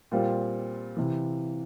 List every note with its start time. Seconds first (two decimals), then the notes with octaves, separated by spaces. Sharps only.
0.12 A#2 G3 C4 F4
0.97 C3 E3